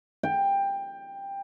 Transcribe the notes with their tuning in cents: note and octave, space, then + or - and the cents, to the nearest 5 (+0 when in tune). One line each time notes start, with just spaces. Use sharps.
G5 +15